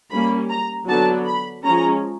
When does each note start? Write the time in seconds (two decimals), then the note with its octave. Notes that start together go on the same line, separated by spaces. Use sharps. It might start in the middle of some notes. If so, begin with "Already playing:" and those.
0.11 G3 A#3 C#4 B5
0.50 A#5
0.88 D3 F#3 B3 D4 A5
1.26 B5
1.64 F3 G#3 C#4 A#5